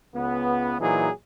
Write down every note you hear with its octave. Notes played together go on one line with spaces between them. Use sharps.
C#2 B3
A#2 E3 F#3 D#4 G#4